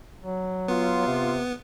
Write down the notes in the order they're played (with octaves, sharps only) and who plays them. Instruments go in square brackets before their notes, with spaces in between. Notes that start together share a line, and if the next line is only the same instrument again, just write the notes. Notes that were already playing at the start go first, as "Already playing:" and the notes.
[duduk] F#3
[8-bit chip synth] B3 [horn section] F4
[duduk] C3